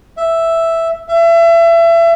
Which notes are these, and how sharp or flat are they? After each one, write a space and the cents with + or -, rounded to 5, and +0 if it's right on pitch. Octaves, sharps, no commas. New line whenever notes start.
E5 +0
E5 +30